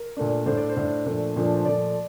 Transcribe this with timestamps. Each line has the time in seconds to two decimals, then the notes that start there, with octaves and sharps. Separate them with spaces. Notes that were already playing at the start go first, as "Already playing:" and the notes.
Already playing: A#4
0.17 A#2 A3 D4
0.46 A2 A3 D4 C5
0.57 D5
0.69 C5
0.76 A2 A3 D4
1.05 A#2 F3 A3 D4
1.36 A#2 F3 A3 D4
1.55 C5
1.65 A#2 F3 A3 D5